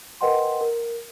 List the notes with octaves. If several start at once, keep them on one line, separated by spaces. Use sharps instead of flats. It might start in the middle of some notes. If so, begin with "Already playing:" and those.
A#4 B4 D#5 F#5 G5 C6
A#4